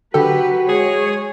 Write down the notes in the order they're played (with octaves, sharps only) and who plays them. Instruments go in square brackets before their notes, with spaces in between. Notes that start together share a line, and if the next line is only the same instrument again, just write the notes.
[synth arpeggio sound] D3 A4 [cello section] F#3 B4 [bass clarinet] F#4 [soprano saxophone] G4
[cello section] G#3 C#5 [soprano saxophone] G#4